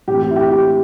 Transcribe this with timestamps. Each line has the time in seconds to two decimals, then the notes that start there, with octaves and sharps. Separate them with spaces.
0.07 A2 E3 C4 G4
0.22 G4
0.31 E4
0.36 G4
0.51 G4